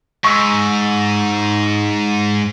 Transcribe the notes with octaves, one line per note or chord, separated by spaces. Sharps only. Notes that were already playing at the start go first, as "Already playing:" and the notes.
G#2 C#6 E6